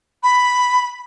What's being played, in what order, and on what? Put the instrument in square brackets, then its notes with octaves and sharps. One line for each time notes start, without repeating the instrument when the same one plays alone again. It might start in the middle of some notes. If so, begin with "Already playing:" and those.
[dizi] B5